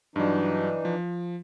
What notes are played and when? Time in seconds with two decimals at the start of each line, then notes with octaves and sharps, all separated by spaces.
0.16 G2 E3 F#3 D4 D#4
0.85 F3